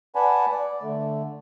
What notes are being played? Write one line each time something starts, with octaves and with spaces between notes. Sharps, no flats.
B4 D5 F#5 G#5 A5 B5
D5
D3 A3